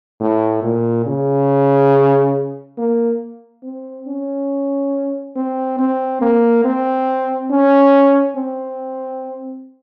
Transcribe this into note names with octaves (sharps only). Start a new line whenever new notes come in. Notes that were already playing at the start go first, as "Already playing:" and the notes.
A2
A#2
C#3
A#3
C4
C#4
C4
C4
A#3
C4
C#4
C4